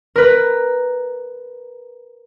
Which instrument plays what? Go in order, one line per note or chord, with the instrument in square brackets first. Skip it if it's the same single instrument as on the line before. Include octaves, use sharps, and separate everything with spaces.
[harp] A#4 B4